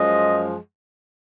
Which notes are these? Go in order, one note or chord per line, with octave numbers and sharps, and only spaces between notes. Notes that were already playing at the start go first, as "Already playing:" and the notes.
Already playing: F#2 F3 G#3 D#5